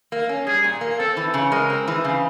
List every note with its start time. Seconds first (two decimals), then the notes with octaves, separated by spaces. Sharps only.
0.12 A#3
0.29 C#4
0.47 G3 G#4
0.64 A#2
0.81 A#3
0.99 C4 A4
1.17 E3
1.34 C#3
1.51 G#3 A#4
1.70 C4
1.88 E3
2.04 C#3